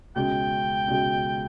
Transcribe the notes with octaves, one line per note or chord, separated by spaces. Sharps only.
C#2 B2 G#3 G5
C#2 B2 G#3